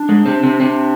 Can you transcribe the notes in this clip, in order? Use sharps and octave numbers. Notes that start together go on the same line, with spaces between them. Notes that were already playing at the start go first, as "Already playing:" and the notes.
Already playing: D4
G#2 G#3
C3 C4
C3 C4
C3 C4 D4